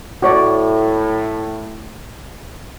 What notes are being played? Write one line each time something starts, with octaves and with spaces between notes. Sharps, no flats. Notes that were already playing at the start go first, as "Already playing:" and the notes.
A2 F#4 C#5 D5